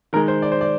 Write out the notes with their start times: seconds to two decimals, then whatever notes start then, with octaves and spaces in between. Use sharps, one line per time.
0.13 D#3 G#3 A#4
0.28 C5
0.42 D5
0.52 C5
0.61 D5